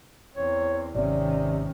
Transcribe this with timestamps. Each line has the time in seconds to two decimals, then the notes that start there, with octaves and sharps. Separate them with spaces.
0.36 E2 C4 C#5
0.95 G#1 C3 D#3 C4 C#4 D5